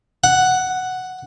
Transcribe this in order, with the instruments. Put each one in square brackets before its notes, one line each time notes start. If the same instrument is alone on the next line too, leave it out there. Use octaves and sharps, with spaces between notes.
[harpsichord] F#5